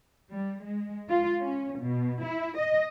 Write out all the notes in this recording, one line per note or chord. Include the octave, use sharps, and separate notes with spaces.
G3
G#3
F4
C#4
B2
E4
D#5